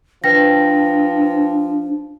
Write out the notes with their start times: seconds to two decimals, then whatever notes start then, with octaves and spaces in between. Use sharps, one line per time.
0.24 F3 D4 B4 G5 A#6